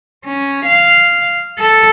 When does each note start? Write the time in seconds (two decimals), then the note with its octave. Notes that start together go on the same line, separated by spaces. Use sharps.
0.25 C#4
0.66 F5
1.59 A4